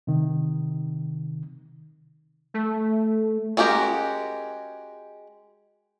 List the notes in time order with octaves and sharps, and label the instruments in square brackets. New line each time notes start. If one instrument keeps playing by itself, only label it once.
[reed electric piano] C3 D#3
[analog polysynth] A3
[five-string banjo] G#3 C#4 F#4 G4 A#4